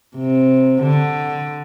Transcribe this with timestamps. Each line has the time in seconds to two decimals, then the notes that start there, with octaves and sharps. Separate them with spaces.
0.17 C3
0.82 D3